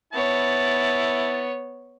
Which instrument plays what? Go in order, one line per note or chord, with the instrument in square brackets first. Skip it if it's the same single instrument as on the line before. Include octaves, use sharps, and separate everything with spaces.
[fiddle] B3 C#5 [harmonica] E4 A5